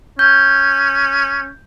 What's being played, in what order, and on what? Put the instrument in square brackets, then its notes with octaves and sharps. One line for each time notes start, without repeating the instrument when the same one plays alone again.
[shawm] C#4 [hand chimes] G6